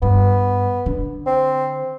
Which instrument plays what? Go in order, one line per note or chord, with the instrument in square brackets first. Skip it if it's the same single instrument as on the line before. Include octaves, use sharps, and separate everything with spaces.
[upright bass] G2 [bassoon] B3
[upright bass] D3
[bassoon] C4